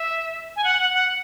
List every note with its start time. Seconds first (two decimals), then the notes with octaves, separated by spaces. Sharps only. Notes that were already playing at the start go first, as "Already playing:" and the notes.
Already playing: E5
0.56 G#5
0.64 F#5
0.79 F#5
0.94 F#5